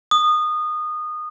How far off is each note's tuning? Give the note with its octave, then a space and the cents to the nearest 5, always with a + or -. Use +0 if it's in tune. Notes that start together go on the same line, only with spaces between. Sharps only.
D#6 -20